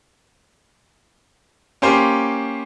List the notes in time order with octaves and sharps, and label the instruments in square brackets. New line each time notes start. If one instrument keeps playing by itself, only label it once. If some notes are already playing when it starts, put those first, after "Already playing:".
[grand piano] A#3 C#4 G4 C5